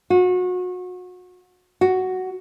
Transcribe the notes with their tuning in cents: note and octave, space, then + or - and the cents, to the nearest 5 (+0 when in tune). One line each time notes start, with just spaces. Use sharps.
F#4 -30
F#4 +5